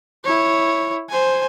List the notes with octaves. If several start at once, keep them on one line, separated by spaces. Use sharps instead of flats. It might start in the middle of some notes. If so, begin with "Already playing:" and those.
E4 C#5
C5 G#5